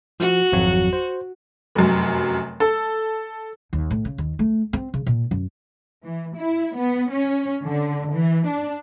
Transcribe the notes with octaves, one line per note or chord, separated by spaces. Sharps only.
F3 F#4
G#1 F2 F#3
C5
F1 F#2
A4
D#2
A2
C#3
D#2
A3
C4
C#3
A#2
F#2
E3
E4
B3
C#4
D3
E3
D4